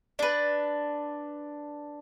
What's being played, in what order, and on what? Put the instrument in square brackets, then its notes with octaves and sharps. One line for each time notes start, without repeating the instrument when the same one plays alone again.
[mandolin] D4 B4